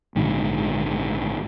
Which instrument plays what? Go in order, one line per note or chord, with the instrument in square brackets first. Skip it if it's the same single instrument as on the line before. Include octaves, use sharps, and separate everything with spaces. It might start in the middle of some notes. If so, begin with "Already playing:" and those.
[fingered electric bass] A#1 G#2 D3 D#3